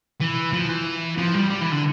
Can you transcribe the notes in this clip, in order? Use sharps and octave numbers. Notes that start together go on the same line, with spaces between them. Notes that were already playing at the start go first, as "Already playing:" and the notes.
E3
F3
E3
F3
G3
G3
E3
D3